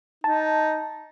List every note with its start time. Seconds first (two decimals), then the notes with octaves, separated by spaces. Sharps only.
0.24 D#4 A5